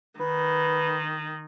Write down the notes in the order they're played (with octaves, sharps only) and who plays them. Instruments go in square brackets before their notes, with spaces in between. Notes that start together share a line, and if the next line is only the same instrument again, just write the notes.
[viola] D#3 [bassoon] B4